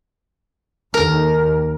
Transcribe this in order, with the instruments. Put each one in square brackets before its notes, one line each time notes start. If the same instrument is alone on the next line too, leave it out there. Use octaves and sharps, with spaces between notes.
[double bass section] D#2 [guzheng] A#4